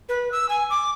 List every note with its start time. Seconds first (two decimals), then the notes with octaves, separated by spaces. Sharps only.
0.09 B4
0.32 E6
0.49 G#5
0.70 D6